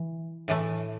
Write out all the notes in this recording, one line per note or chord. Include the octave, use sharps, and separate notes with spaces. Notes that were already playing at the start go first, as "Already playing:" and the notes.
Already playing: E3
A2 E3 A3